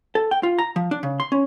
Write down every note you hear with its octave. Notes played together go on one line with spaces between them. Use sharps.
A4
G5
F4
A#5
F3
D4
C#3
C6
C#4